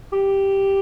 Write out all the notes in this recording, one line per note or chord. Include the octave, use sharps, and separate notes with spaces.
G4